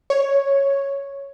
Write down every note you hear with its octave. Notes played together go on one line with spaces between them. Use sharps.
C#5